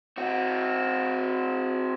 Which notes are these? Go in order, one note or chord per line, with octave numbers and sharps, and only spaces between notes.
C4 F#4